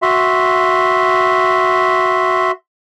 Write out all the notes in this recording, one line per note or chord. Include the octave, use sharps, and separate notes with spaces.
F#4 E5 C6